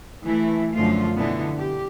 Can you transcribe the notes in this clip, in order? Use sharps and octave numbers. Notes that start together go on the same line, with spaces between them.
E3 A3 E4
F#2 D3 F3 A3 F4
B2 D3 E3 B3
G4